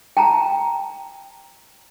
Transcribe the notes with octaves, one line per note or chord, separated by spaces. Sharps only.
G5 A5 A#5